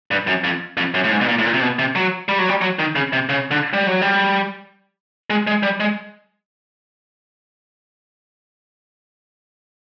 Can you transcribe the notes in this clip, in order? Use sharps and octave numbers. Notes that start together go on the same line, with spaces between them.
G2
F#2
F2
F2
F#2
A2
G#2
B2
A#2
A2
A#2
C3
B2
C3
F#3
G3
F#3
G3
F#3
D#3
C#3
C3
C#3
D3
G3
F#3
G3
G#3
G#3
G3
G#3